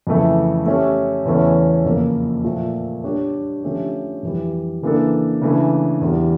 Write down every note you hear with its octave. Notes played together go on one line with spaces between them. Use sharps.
F2 C#3 E3 A3 E4
A3 C#4 G4
E2 C#3 E3 A3 C#4
F2 C#3 F3 A#3
A#2 F3 A3
G3 D4 G4 C#5
D3 F3 A3 C#4 G4
F2 E3 G3
C#3 E3 A#3 D4 A4
C#3 E3 A3 D4
E2 E3 G3